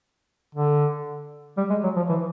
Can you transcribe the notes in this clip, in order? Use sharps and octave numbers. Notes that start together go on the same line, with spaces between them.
D3
G3
G#3
F#3
F3
E3